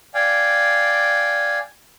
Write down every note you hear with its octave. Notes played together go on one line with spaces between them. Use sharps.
D5 F5 G5 G#5